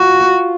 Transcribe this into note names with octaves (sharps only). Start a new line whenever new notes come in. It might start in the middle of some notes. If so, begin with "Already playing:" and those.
Already playing: F4 F#4